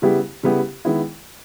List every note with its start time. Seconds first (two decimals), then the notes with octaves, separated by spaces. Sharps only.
0.02 C#3 G3 B3 E4 G4
0.43 C#3 G3 B3 E4 G4
0.85 D#3 G#3 B3 E4